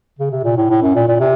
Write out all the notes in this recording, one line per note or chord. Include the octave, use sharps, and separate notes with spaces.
C#3
C3
A#2
A2
A2
F#2
A#2
A#2
C3